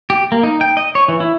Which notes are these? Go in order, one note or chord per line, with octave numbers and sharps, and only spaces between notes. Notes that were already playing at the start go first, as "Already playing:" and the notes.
G4
A#3
D#4
G5
D#5
C#5
E3
E4